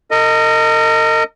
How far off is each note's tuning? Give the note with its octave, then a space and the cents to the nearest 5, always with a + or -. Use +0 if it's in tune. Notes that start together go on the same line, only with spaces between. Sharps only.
A#4 -40 D#5 +0